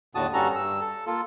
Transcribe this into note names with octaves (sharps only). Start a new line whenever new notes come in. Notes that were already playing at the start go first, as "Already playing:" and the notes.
D#2 A2 D3 F#4 A5 D#6
G2 G3 C#4 F#4 A4 A#5
G2 E6
A4
A#3 F4 A4